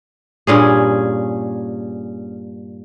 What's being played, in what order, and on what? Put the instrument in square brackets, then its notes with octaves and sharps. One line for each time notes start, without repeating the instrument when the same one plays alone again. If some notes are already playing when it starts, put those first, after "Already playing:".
[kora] G2 A#2 C#4 G#4